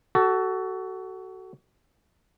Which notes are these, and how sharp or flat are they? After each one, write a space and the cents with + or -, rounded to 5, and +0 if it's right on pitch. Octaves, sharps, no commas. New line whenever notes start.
F#4 +25 A4 +0